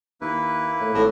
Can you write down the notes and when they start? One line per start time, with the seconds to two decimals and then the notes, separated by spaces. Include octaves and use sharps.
0.21 D#2 A#3 E4 B4
0.81 A2
0.94 G#1 A2